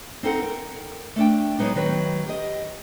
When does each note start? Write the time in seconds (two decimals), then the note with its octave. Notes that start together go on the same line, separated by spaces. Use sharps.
0.23 C4 D#4 A4 F#5
0.42 A#4
1.16 A3 D4 G5
1.59 F#3 G#3 B3 D#4
1.75 D#3 F#3 B4
2.26 G4 D#5